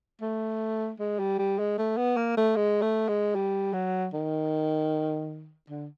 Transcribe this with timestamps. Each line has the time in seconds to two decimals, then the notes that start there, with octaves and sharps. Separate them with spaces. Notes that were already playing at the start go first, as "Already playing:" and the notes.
0.22 A3
1.00 G#3
1.19 G3
1.39 G3
1.59 G#3
1.78 A3
1.97 B3
2.17 A#3
2.37 A3
2.56 G#3
2.82 A3
3.08 G#3
3.35 G3
3.73 F#3
4.14 D#3
5.70 D3